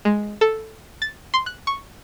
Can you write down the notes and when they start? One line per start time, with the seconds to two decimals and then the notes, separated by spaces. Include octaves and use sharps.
0.05 G#3
0.41 A4
1.02 A6
1.34 C6
1.46 F#6
1.67 C#6